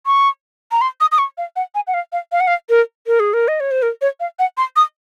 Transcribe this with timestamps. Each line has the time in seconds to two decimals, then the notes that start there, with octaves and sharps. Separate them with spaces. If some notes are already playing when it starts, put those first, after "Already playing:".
0.06 C#6
0.72 A#5
0.81 C6
1.01 D#6
1.12 D#6
1.18 C#6
1.38 F5
1.56 F#5
1.75 G#5
1.87 F#5
1.94 F5
2.12 F5
2.32 F5
2.40 F#5
2.47 F5
2.69 A#4
3.07 A#4
3.20 G#4
3.33 A#4
3.48 D#5
3.60 C#5
3.71 C5
3.82 A#4
4.01 C#5
4.20 F5
4.39 F#5
4.57 C6
4.76 D#6